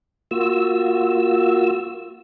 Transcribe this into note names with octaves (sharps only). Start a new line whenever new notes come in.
A#3 F4 F#4 E6